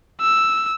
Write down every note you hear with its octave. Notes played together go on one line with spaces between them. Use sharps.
E6